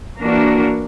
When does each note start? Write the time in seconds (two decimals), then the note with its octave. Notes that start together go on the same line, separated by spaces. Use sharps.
0.21 E3 A#3 D4 F#4 A#4